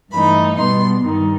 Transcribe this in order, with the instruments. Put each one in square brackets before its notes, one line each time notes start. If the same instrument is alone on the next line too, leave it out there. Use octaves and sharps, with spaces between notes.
[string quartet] G2 E3 A3 D#4 B5
B2 G3 B3 C6
G2 D#3 G3 D#4